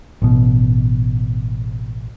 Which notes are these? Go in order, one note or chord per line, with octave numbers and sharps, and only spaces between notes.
A1 B2